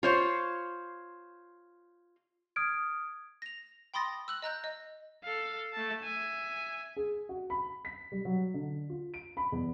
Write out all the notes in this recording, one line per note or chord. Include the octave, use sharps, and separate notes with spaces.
F4 C5 C#5
D#6 F6 G#6 D7
A#6 F7
G5 B5 C6 D#6 A6 A#6
E6 F#6 F#7
D#5 A#5 F#6 G6
D#5
A4 F5
A3 A5
E5 G#5
G#4
F#4
B5
B6
G3
F#3
D3
F4
D7
B5
E2